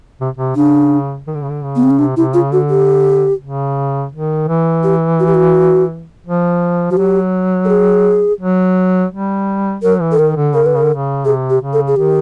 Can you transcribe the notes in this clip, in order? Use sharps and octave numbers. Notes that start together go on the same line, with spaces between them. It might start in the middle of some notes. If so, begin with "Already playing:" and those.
C3
C3
C#3 D4
D#3
D3
C#3
D3
C#3
B3
C4
C#4
C3 D4
C3 E4
C#3 F4
D3 F#4
G4
C#3
D#3
E3
G4
F#4
G4
F#4
F3
F3 F#4
F#3 G4
A4
G#4
F#3
G3
F#3 A#4
E3
A4
D#3 A#4
D3
C#3 A#4
D3 B4
C#3 A#4
D3
C#3
C3 G#4
G4
C#3
A4
G#4
D#3 G4